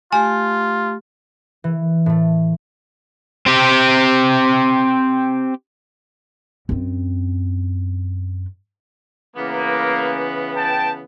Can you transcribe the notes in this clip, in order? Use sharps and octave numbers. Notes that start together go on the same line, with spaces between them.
A3 F4 G4 G#5
E3
A2 A3
C4 G4
F#2 C4
C#3 E3 A#3 B3
G5 A5